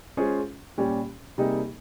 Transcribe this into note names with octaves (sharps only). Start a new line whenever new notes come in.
G#3 C#4 F4 G#4 C5
A#2 G3 C#4 G4
C3 G3 A#3 D#4 G#4